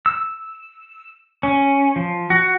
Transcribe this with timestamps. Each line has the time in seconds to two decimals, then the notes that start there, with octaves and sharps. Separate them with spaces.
0.06 E6
1.43 C#4
1.96 F3
2.30 F#4